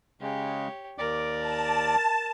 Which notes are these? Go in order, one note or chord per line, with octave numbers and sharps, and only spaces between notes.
C#3 G#3 G4 C#5
D#2 A#4 D5 D6
A5